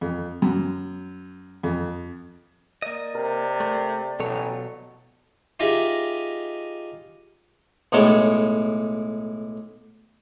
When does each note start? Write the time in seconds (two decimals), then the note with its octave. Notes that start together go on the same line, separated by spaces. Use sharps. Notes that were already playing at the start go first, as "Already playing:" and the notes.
0.01 F2
0.42 F#2
1.63 F2
2.82 A#3 D5 D#5
3.15 C3 A#4
3.60 A3
4.20 A1 B2 F#3 A4 C#5
5.60 D#4 F4 G4 G#4 D#5 E5
7.92 B1 A2 G#3 C#5 A5